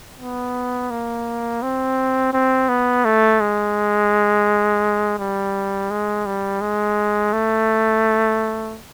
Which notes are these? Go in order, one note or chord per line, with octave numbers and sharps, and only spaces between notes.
B3
A#3
C4
C4
B3
A3
G#3
G3
G#3
G3
G#3
A3